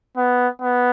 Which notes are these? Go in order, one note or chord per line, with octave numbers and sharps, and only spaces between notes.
B3
B3